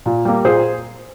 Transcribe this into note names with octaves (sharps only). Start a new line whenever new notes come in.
A#2
G3 A#3
A#2 G#4 C5